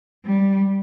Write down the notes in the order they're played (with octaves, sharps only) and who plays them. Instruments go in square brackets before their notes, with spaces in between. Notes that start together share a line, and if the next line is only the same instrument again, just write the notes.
[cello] G3